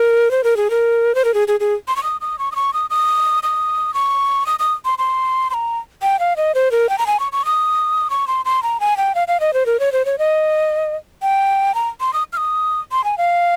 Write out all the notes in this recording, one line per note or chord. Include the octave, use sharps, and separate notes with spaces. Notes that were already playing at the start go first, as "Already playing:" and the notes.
Already playing: A#4
C5
A#4
G#4
A#4
C5
A#4
G#4
G#4
G#4
C6
C#6
D#6
D#6
C#6
D#6
C#6
D#6
D#6
D#6
C#6
D#6
D#6
C6
C6
C6
A#5
G5
F5
D#5
C5
A#4
G5
A#5
G#5
C#6
C#6
D#6
C#6
C6
C6
A#5
G#5
G5
F5
F5
D#5
C5
A#4
C#5
C5
C#5
D#5
G5
A#5
C6
D#6
F6
D#6
C6
G#5
F5